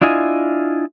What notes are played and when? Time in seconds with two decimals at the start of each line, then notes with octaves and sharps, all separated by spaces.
0.02 D4 E4 F4 D#5 G#5